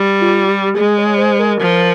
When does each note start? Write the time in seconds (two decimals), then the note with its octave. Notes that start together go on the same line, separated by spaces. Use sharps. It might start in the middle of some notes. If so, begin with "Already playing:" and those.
Already playing: G3
0.21 F4
0.49 G4
0.76 G#3 G#4
0.98 C#5
1.18 C5
1.39 A#4
1.61 F3